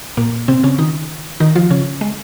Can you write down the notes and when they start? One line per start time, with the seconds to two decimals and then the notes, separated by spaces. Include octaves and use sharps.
0.17 A#2 A#3
0.48 C3 C4
0.63 C#3 C#4
0.78 D#3 D#4
1.40 D#3 D#4
1.55 F3 F4
1.70 C#3 C#4
2.01 G#3